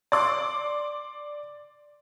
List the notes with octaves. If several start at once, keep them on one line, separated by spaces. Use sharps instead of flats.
D5 C6 D6